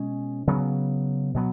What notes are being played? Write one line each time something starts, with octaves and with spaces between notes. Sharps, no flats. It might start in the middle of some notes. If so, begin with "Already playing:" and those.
Already playing: B2 G#3 C#4
C#3 F#3 B3
B2 F#3 B3